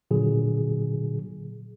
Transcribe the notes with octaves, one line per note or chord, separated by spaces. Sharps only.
A#2 D3 F#3 G#4